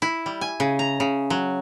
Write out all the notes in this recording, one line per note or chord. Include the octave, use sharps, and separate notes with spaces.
E4
G3
G#5
C#3
A#5
C#3
F#3